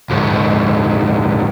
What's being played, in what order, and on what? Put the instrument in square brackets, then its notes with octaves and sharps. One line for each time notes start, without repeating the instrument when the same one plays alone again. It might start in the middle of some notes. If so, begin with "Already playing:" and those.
[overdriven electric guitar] D2 G#2